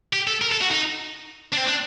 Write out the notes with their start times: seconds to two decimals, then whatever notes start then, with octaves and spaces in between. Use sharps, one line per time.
0.13 G4
0.27 A4
0.41 A#4
0.52 A4
0.61 F#4
0.71 D#4
1.53 D4
1.58 C4
1.68 D4